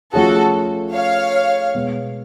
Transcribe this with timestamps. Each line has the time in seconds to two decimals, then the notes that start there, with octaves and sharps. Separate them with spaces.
0.14 F3 A3 C#4 F4 F#4 G#4 A4
0.94 C#5 F5
1.74 B2 G#3 B3